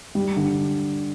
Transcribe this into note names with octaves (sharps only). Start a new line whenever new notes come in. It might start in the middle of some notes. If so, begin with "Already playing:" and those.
G3
D3